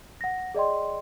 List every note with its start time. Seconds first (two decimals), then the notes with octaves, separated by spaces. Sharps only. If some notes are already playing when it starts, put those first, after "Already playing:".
0.21 F#5 A#6
0.55 G#4 D5 D#5 G5 C6